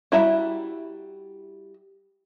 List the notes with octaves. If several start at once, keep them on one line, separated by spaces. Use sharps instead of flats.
G3 E4 F#4 E5 A#5